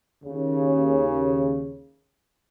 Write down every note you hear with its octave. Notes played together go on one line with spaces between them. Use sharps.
D#2 C#3